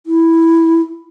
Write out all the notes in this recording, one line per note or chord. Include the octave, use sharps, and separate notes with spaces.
E4